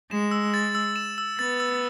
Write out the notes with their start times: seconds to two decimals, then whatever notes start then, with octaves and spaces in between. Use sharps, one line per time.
0.11 G#3 E7
0.31 E6
0.54 A6
0.75 E6
0.96 E7
1.18 E6
1.39 B3 A6
1.60 E6